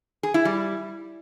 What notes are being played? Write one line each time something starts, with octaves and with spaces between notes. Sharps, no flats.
G#4
E4
G3